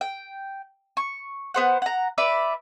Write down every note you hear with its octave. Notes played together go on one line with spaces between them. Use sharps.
G5
C#6
B3 C5 F#5
F#5 A#5
B4 D5 E5